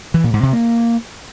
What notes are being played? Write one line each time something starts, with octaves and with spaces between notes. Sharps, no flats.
E3
A#2
G#2
C3
A#3